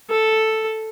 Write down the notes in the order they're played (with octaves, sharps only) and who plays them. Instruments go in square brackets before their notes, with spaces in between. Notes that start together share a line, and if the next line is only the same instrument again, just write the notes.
[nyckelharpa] A4